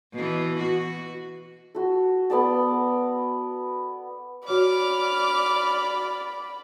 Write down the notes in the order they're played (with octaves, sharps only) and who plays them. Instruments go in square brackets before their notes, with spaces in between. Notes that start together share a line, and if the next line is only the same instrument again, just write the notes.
[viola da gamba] B2 E3
F#4
[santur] F#4 A4
B3 A4 D5 A5
[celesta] F#4 C#5 [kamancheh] D5 B5 [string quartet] D6 F6